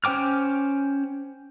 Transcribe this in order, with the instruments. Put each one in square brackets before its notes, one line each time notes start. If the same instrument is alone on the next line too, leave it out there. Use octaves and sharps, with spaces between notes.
[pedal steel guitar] C#4 C5 G5 D6 F6